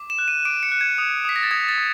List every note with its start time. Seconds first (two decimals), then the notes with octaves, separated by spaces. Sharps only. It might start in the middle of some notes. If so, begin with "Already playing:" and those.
Already playing: D6
0.10 E7
0.19 F#6
0.28 D#7
0.45 D6 D7
0.63 C#7
0.72 F#6
0.81 G#6
0.98 D#6
1.25 D#6 B6
1.36 A#6
1.43 A6
1.51 D#6 G#6
1.69 A6
1.78 D#6